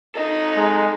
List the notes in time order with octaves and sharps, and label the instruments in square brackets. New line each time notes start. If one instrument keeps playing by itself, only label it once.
[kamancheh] D#4 [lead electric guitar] A4 D#5
[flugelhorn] G#3